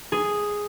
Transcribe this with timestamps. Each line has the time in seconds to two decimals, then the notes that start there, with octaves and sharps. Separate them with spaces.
0.12 G#4